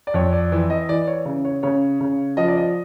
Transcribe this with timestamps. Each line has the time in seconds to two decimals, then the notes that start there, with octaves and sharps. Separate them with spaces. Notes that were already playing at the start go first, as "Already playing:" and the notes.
0.07 D5
0.14 F2 C#5
0.33 D5
0.52 E3
0.70 D#5
0.89 E3 D5
1.07 C#5
1.26 C#3
1.45 C#5
1.63 C#3 C#5
2.01 C#3
2.37 F3 D#5
2.48 D5
2.57 D#5